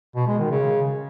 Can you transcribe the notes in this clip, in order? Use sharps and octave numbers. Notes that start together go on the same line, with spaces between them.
B2
G#3
D#3
C#3